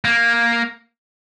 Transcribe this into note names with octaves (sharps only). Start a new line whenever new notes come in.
A#3